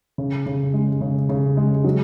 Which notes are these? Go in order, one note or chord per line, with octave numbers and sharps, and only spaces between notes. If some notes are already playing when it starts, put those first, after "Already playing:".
C#3
C#3
G#3
C#3
C#3
G#3
F#3